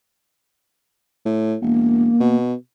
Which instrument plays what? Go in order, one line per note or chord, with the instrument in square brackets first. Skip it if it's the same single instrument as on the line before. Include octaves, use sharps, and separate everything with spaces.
[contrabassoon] A2
[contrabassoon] E1 [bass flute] A#3
[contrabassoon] B2